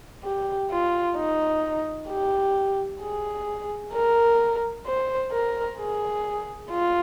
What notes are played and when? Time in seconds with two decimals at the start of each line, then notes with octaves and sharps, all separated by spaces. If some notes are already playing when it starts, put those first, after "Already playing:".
0.24 G4
0.71 F4
1.16 D#4
2.09 G4
3.01 G#4
3.93 A#4
4.86 C5
5.32 A#4
5.79 G#4
6.71 F4